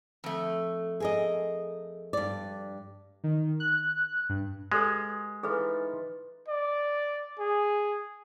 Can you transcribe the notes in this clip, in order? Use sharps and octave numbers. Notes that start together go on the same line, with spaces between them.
F2 A3
G#4 A#4 D#5
G2 D5
D#3
F#6
G2
G#3 G4 A4 B4
E3 D#4 F4 G#4 A4 B4
D5
G#4